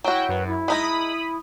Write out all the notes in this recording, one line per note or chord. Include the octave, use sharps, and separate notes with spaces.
F#3 E4 F#4 G5
F#2 B4
E4
G#3 D#4 A#5 B5 D#6